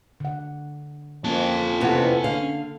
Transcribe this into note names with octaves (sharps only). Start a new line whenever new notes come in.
D3 F#5
F2 A#3 C#4 A5
E2 C3 B3 A4 F#5
D3 F5